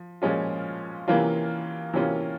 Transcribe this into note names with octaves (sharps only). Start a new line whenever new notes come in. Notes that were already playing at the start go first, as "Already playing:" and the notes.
Already playing: F3
A#2 F3 G#3 C#4 F4
C3 E3 A#3 C#4 F4
C3 E3 A#3 C#4 F4